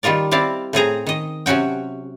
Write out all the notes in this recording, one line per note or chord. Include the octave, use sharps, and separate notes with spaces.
D#3 G3 F4 A#4 D5
C4 E4 D5 F5
A2 C4 G#4 A#5
D#3 D#5
C3 F#3 C#4 F#4 G5